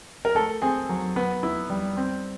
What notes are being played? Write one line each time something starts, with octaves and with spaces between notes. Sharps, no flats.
A#4
A3 A4
C4 G#4
F#3
B3
E4
G3
C4